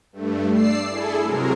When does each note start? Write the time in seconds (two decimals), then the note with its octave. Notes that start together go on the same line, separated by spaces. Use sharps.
0.13 G2 A3
0.52 D5 E6 C7
0.90 E4 G#4 A4
1.24 C3 F#3 G#3 A#4